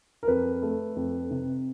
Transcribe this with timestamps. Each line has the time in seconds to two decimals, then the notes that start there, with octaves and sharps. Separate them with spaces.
0.23 A#4
0.28 F2 B4
0.62 A3
0.96 F2
1.31 C3